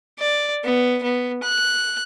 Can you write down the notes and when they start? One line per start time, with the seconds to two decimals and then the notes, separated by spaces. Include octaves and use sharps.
0.19 D5
0.64 B3
1.03 B3
1.43 F#6